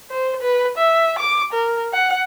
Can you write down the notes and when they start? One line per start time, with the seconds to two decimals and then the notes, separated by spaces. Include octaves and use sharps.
0.10 C5
0.42 B4
0.78 E5
1.19 D6
1.53 A#4
1.93 F#5